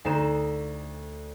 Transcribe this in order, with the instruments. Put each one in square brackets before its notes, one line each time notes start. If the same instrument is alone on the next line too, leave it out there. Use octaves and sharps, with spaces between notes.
[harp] D2 D#4 C5 E7